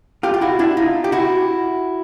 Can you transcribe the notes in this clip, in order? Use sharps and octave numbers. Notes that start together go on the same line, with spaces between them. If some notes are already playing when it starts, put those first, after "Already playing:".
F4 G4
F4
E4 F#4
D4 E4
D#4 F4
G4
E4 F#4